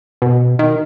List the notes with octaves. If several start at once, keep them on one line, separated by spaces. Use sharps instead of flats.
B2
D#3